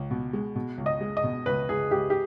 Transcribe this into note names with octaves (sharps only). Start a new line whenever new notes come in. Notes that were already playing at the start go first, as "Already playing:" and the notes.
Already playing: C#2
B2
G#3
B2
C#2
D#5
G#3
D#5
B2
C#2 B4
C#2 G#4
C#2 G4
G4